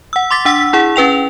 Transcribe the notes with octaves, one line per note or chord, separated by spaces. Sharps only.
F#5 E6
C6 D6 A6 B6
D4 F#5 E6 B6
E4 G#4 F#5
C#4 B4 G5 F7